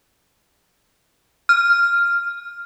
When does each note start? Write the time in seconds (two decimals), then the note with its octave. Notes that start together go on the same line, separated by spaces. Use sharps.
1.49 F6